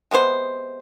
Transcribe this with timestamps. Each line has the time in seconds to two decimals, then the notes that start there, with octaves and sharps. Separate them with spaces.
0.11 C3 G#3 B3 C5